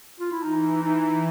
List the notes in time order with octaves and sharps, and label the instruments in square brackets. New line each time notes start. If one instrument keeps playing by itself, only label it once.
[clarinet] F4
E4
[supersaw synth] E3 [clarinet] D#4
[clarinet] D#4